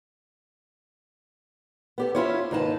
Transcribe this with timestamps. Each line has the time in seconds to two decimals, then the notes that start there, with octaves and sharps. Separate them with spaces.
1.98 B3 G4 A4
2.15 C#4 E4 F4 C#5
2.51 D#2 G#2 D#4 B4 A5